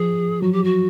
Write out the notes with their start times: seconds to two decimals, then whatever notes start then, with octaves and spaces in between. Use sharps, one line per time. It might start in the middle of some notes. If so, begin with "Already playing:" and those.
Already playing: F3 G#4
0.42 F#3 F#4
0.52 G4
0.64 F#4